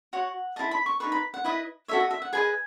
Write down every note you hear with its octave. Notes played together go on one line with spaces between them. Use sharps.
F#4 C#5 F#5
E4 G#4 D#5 A5
B5
C#6
D#4 G#4 B4 C#6
B5
F#5
E4 B4 D#5
F#4 A4 C#5 E5
D#5
E5
F#5
G#4 B4 D#5 G#5